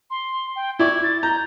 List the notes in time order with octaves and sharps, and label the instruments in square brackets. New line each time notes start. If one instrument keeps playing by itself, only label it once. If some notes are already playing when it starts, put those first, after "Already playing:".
[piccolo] C6
G5
[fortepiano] E4 D5 C#6 [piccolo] G#6
[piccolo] A6
[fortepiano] A#5 [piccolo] G6